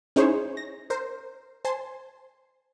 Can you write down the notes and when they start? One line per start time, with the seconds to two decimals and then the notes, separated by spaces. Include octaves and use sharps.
0.16 C#4 D#4 E4 G#4 C5 C#5
0.57 A#6
0.90 A#4 C5
1.65 C5 G#5 A5 C6